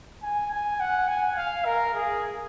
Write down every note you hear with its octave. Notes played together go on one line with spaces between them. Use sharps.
G#5
G#5
F#5
G#5
F5
A#4
G#4